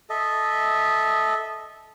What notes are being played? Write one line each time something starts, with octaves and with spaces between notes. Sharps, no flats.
A4 D#5 E5